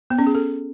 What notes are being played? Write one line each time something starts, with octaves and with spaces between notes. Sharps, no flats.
B3
C#4
G#4
A4